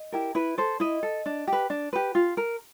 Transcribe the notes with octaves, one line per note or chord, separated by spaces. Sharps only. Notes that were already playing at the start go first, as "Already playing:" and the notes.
Already playing: D#5
E4 G4 A#4
E4 B4
A4 C5
E4 D#5
A4
D4
G4 B4
D4
G4 B4
F4
A#4